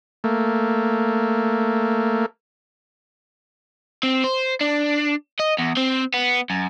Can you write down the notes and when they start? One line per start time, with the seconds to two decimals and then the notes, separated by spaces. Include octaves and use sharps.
0.24 A3 A#3
4.03 C4
4.24 C5
4.61 D4
5.40 D#5
5.59 E2
5.77 C4
6.14 B3
6.50 F#2